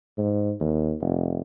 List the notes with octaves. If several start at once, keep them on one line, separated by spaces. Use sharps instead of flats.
G#2
D#2
F1